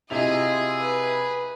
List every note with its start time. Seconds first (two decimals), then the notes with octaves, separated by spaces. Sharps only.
0.10 C3 E4 F4 G#4 D#5 G#5 F7
0.79 B4